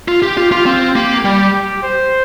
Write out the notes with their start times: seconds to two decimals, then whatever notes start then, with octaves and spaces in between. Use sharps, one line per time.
0.08 F4
0.23 G4
0.37 F4 G4
0.52 F4
0.66 C4 F4
0.95 A#3 G4
1.25 G3 G4
1.54 G4
1.83 C5